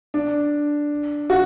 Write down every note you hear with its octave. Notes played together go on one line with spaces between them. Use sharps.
D4
F#4